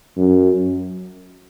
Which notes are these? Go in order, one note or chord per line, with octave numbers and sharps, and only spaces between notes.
F#2